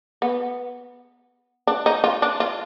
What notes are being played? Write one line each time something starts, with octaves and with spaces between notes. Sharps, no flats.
B3
D4
D#4
F4
D4
F4